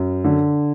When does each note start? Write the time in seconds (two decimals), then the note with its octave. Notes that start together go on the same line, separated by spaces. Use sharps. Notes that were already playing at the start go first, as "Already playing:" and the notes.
Already playing: F#2
0.24 D3